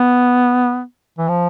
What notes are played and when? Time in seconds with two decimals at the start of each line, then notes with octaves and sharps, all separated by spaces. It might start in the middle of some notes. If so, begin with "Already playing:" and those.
Already playing: B3
1.18 E3
1.28 F3